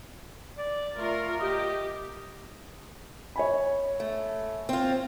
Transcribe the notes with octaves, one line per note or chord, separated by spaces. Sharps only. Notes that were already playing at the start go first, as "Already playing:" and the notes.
D5
A3 F4 A#4
G4 D#5
C#5 G#5 B5
A3
C4 F4